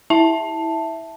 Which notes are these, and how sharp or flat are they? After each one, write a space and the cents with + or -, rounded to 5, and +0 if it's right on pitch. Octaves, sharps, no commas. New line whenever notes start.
E4 -20 E5 +0 A5 +5